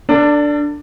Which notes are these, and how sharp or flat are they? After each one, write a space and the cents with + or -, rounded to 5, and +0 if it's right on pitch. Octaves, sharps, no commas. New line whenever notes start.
D4 +0 A4 +40